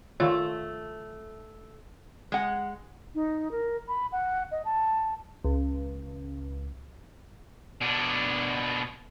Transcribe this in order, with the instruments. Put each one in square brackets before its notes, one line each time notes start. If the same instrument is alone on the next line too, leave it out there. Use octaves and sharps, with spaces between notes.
[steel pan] D#3 F4 C#5 [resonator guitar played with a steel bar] A3
[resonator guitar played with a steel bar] G#3 F#5
[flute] D#4
A#4
B5
F#5
D#5
A5
[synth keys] C#2
[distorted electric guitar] B2 D4